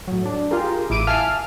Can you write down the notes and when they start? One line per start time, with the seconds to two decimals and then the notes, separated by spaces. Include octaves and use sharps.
0.07 A2 F#3
0.25 D4
0.51 F4 G4 G#4 A#4
0.90 A1 E4 D6 D7 D#7
1.07 E5 F5 G#5 A5 F6